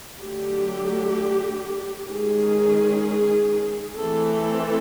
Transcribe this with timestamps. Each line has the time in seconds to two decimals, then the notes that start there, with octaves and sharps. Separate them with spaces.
0.20 D3 F#3 A3 G4
2.08 D#3 G#3 C#4 G#4
3.96 E3 A3 C4 A4